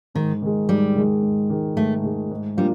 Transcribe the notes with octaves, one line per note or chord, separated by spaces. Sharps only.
G#2 D#3
D#3 G#3
G#2 G3
D#3 G#3
G#2
D#3 G#3
G#2 A3
D#3 G#3
G#2
F3 G3 A#3 D4 F4